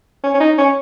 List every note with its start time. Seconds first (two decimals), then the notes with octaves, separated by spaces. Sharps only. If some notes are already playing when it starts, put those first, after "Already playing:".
0.23 C#4
0.34 C#4
0.40 D#4
0.58 C#4